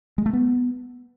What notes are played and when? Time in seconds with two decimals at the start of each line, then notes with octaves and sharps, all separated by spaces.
0.18 G#3
0.26 A3
0.33 B3